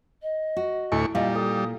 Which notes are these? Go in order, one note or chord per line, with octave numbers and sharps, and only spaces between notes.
D#5
F#4
D2 A2 E4 G#5 C#6
A#2 G3 D#5 F5
A4 D#6